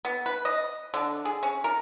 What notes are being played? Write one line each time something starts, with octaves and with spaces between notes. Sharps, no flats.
B3
B4
D#5
D3
G#4
C#4
A#4